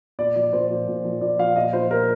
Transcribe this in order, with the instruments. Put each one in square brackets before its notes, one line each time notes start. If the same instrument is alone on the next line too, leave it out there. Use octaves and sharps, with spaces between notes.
[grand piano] A#2 D5
F3 D5
A#2 C5
F3
A#2
F3
A#2 D5
F3 F5
A#2 D#5
F3 C5
A#2 A#4